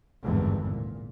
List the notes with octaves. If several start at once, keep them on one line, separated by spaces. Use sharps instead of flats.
G#1 E2 G2 D3 E3
A#2